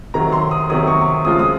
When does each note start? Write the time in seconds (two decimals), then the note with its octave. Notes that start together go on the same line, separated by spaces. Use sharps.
0.14 C3 D#3 F#3 A#5
0.32 C6
0.51 D#6
0.70 C3 D#3 F#3 D#6
0.87 C#6
1.25 C#3 F3 G#3 C4 F4 D#6
1.39 D#6